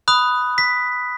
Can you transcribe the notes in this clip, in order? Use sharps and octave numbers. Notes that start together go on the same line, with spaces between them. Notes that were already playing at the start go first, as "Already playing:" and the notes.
B5 D#6 F#6
B6